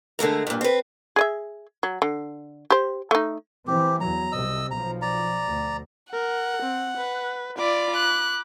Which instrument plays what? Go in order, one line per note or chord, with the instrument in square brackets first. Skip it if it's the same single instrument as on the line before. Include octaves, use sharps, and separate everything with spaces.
[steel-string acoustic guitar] D3 G#3 A3 A#4
G2 A#2
C4 B4
[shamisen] G#4 D#5 E5
F#3
D3
G4 C5
A3 D#4
[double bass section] E3 C4 [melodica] G4
[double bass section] E2 F#3 [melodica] A#5
[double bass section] C2 C3 [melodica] D#5 E6
[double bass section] B1 F3 [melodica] A#5
[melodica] D5 A#5
[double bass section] D2
[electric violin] A#4 [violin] F#5
[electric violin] C4
B4
[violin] F4 D5 [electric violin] B5 D6
[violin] F#6